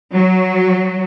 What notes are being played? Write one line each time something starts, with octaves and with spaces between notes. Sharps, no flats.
F#3